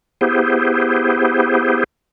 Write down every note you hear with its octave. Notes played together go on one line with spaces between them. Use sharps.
B3 E4 G4 G#4 C5